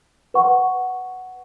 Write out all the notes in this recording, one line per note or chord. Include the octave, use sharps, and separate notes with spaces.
B4 F#5 C#6